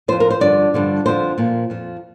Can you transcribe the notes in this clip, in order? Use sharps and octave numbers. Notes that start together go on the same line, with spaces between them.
F2 F3 C5
A#4
C5
G2 D3 F3 D5
G2 D3 F3
F2 D3 F3 C5
A#2 F3
F2 F3